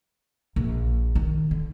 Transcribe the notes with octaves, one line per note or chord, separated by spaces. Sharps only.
A#1
D#3
D3